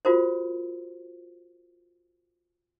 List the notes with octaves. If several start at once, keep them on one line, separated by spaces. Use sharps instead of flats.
F4 F#4 A#4 C5